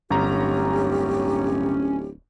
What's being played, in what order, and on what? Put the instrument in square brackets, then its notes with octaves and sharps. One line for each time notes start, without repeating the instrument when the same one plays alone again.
[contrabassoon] D1 [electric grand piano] G1 A#5 [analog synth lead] C#4 [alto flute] G4